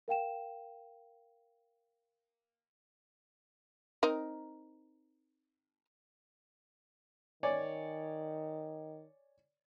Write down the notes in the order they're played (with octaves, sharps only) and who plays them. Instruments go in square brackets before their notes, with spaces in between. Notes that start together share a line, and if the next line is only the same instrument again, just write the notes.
[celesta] A#4 F5 G5 E7
[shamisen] C4 D#4 A#4
[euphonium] D#3 [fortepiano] C#5 D5 G#5